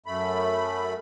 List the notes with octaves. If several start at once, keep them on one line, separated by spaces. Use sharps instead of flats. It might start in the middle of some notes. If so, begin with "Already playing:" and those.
F#2 A3 B5